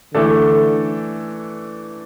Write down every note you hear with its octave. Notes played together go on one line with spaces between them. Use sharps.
D3 E3 A3 D4 A4